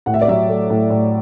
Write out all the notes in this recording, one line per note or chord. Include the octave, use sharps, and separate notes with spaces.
A2 F#5
E5
D5
F#3 E5
A3
A2
A2